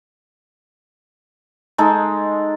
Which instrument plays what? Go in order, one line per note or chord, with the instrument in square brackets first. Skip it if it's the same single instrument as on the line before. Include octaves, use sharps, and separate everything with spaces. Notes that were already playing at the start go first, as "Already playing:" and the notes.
[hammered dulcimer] G#3 D#4 A4